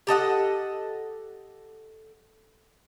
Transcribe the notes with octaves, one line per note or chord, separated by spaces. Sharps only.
G4 A4 D#5 F#5